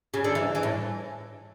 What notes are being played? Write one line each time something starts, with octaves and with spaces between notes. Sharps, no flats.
C#3
D3
E3
E3
A2